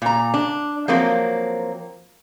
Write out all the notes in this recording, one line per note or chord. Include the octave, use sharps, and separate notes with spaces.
A#2 A#5
D4
F3 F#3 A#3 C4